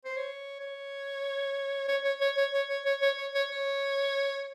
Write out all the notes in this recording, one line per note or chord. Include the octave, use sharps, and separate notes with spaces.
C5
C#5
C#5
C#5
C#5
C#5
C#5
C#5
C#5
C#5
C#5
C#5
C#5
C#5